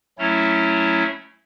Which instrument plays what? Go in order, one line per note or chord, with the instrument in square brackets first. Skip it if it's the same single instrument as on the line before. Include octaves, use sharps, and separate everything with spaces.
[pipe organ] F#3 A3 C#4 E4 C#5